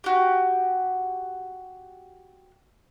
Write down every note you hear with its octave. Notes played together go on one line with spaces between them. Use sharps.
F#4 G4